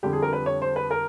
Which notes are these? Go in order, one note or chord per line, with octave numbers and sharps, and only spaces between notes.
F2 D3 G3 G4
G#4
A#4
B4
C#5
C5
B4
A#4